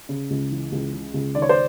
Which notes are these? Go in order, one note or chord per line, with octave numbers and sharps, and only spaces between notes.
C#3
C#2
E3
C#2
C#3
C#2
D#3 D5
C#5
C5 D5